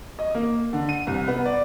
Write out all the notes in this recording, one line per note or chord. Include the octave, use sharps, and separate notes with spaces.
D#5
A#3
D3
D#7
C2
B3
D5